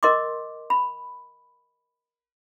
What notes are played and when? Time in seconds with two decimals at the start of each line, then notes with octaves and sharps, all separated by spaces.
0.03 A#4 D#5 C6 D6
0.70 B5